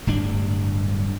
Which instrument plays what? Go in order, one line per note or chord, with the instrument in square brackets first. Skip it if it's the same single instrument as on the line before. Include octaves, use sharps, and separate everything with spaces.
[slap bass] D1 G2 D4